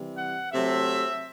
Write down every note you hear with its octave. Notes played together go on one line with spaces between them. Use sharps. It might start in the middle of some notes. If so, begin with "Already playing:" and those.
Already playing: C3 E3 G3
F#5
C3 F#3 A3 C4 E5